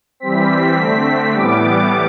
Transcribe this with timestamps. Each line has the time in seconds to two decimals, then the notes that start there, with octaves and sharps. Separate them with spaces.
0.20 E3 G3 C4 B6
0.49 B6
0.77 D3 A3 C4
1.33 A2 E3 G3 B3 D6